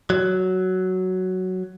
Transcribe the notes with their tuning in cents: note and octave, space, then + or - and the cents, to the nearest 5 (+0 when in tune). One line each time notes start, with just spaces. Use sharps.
F#3 +5